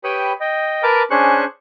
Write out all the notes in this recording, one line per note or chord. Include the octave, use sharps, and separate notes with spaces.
G4 B4 C#5 G5 B5 D#6
D#5 G5
A#4 B4 A5 D6
C#4 D4 G#4 C5 C#6 F#6